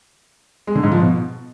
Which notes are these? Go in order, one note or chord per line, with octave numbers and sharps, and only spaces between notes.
G#3
D3
G#2
F3
B2